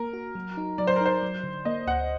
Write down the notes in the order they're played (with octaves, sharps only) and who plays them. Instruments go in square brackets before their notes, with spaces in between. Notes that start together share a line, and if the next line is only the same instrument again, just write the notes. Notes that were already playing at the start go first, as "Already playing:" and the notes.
Already playing: [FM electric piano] A#3 [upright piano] A#4
[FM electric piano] F#4
F#3
D#4
[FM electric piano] F#3 [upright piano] D5
[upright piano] C5
A#4
[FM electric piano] D#4 [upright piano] C5
[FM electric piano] F#3
D3
[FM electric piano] A#3 [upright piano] D#5
[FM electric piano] D2 [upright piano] F#5